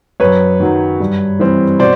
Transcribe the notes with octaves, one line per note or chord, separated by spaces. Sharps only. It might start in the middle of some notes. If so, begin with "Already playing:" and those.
F#2 B4 C#5
D#3 F#3
G2
E3 G3 C4
B2 C5 D5